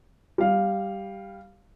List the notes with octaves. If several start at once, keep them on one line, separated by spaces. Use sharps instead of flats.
G3 F5